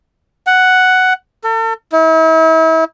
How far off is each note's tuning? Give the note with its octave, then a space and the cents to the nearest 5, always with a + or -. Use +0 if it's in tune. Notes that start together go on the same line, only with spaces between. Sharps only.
F#5 +5
A4 +40
E4 -40